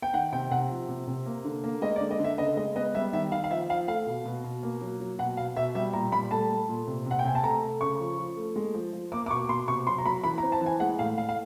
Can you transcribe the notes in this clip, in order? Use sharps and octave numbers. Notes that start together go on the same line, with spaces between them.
G5
D#3 F#5
C3 G5
C3 F#5
F3
C3
C3
A#3
D3
A#3
G#3 D#5
D5
D3
D#5
D3 E5
C#3 D#5
G#3 D#5
B3 D#5
G3 E5
D#3 E5
D#3 F5
F5
F3 E5
F3 F5
A3 F5
B2
B2
B2
A#3
F#3
F#3
B2 F#5
B2 F5
B2 E5
G3 E5
A#2 A#5
G3 B5
A3 A5
A3
A#2
C3
C3 F#5
G5
C3 G#5
A5
A3 A#5
A3
C#3 C#6
F3
F3
A3
G#3
F3
F3
A#3 D6
D6
B2 C#6
B2 C6
C3 C#6
F#3 C6
A#5
F#3 B5
E3 B5
A#5
C4
A5
E3
G#5
G#3 F#5
A2 F5
A2 F5
F5